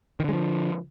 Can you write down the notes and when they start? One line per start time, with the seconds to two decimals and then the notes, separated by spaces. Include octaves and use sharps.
0.20 D#3
0.24 D3
0.29 G#3
0.33 F3